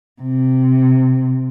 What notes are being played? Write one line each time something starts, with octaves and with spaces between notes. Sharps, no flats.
C3